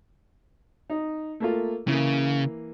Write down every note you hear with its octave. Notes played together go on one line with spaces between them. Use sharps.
D#4
A3 A#3 F4
C#3 E3 A#3